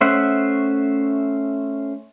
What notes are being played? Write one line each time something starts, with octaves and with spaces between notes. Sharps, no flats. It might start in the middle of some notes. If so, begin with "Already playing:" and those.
A3 C#4 C5 E5 F#5